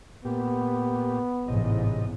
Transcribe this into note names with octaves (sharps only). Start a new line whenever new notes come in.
A#2 B3 G4
A1 E2 G#2 C3 D#5